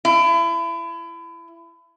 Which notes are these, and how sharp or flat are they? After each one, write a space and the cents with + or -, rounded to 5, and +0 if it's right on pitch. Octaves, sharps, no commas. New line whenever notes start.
E4 +30